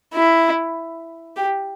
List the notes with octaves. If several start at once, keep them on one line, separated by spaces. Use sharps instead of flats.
E4
G4